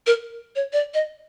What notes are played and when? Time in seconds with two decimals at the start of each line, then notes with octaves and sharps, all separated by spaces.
0.07 A#4
0.56 C#5
0.73 D5
0.94 D#5